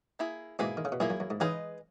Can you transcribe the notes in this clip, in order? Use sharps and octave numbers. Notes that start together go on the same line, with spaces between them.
A#3 E4 G#4
G#2 B2 A#3 E4 G#4
D#3
C#3
B2
F#2 A#2 A#3 E4 G#4
F#2
F#2
G#2
C#3 E3 G#3 D#4 G#4 B4 D#5